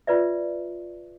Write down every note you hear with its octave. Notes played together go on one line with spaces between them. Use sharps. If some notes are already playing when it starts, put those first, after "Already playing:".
F4 B4 D5 E5